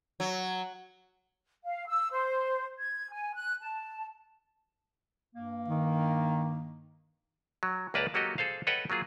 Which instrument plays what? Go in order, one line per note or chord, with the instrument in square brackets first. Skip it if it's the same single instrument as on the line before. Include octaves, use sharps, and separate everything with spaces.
[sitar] F#3
[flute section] F5
E6
C5
G#6
G#5
F#6
A5
[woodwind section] G2 A#3
[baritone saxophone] D#3
[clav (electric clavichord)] F#3
C#2 A#3 B4 D5 A5 A#5
F#3 A#3 F#4 G4 A4 D#5
G#4 A4 C5 F5
A4 B4 C#5 D#5 F#5 G5
F#3 A#3 F4 G#4